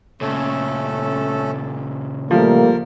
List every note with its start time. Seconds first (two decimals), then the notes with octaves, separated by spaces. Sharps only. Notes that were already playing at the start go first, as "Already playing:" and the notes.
0.21 A#2 C#3 A3 C#4 A4
2.31 F3 G3 A3 A#3 A#4